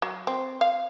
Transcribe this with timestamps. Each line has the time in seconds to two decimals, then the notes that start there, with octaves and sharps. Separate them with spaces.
0.02 F#3
0.27 C4
0.61 F5